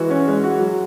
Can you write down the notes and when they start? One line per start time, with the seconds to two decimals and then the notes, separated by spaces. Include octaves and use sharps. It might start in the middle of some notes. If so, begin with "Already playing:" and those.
Already playing: E3 G#3 F#4
0.10 C#4
0.28 G#3
0.44 F#4
0.60 F#3